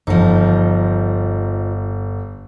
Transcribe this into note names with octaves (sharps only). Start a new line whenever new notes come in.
G1 F3 D#4